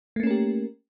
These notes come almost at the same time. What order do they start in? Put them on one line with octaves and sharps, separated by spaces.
A3 A#3 C#4 A#4 G4